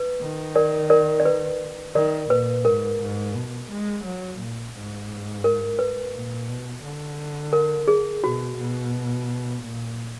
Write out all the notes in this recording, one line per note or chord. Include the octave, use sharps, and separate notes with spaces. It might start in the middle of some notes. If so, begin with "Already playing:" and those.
Already playing: B4
D#3
A#4 D5
A#4 D5
D5
B4
D#3 A#4 D5
A#2 B4
G#2 A#4
G#2
B2
G#3
F#3
A#2
G#2
A#4
B4
A#2
B2
D3
A#4
G#4
B2 F#4
B2
A#2